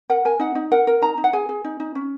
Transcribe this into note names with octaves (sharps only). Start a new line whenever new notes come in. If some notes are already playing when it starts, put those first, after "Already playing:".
A#4 F#5
A#4 G#5
D#4 F#5
D#4
A#4 F#5
A#4
D#4 A#5
D#4
F#5
G#4 G#5
G#4
D#4
D#4
C#4